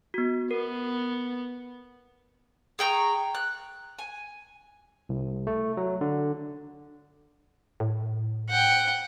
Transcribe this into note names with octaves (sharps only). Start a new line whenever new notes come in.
B3 F#4
B3 A#4
G#4 G5 A#5 C#6
F#6
G#5
C2
A3
F#3
D3
A2
F#5 G5